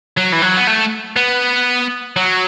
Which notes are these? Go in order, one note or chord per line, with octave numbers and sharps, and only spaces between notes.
F#3
E3
F#3
B3
A3
B3
F#3